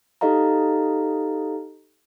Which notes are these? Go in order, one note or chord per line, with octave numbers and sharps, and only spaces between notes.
D#4 G4 A4 D#5 F5 A#5